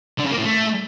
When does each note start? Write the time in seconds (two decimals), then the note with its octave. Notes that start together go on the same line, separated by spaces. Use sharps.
0.18 D3
0.24 C#3
0.31 A#3
0.37 A2
0.44 A3